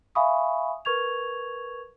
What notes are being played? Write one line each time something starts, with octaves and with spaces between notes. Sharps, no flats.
E5 F5 G#5 B5 C#6 D#6
A#4 B4 C#6 G#6 F7